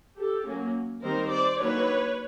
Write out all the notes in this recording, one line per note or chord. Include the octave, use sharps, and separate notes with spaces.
G4 A4
F#3 A#3 C#4
D#3 G3 C4 A#4 C5
C5 D5
D#3 F#3 A#3 D4 B4 C#5